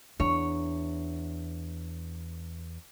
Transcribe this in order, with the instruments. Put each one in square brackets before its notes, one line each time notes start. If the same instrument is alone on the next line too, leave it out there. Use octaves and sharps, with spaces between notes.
[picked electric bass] E2 [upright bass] D4 [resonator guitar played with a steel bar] C#5